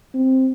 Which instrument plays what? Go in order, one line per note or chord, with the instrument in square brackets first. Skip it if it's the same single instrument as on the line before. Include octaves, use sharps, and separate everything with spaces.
[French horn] C4